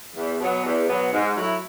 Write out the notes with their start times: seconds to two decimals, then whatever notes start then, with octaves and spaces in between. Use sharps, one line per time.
0.16 E2
0.41 B2 F#3 B3
0.65 E2
0.88 B2 F#3 B3
1.13 G#2
1.37 F#3 A3 E4